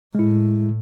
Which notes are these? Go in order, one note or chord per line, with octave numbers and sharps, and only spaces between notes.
A2 G#3 E4